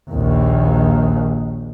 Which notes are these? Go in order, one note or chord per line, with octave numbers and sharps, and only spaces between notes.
A#1 D#2